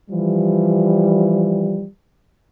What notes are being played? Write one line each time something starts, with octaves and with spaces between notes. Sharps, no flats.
E3 F3 G3